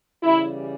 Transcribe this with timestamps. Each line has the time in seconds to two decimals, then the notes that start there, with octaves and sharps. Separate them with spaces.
0.23 C#3 E3 G3 E4